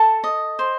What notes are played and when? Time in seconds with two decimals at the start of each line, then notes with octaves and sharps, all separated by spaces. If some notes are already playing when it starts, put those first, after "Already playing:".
Already playing: A4 A5
0.24 D#5
0.59 C5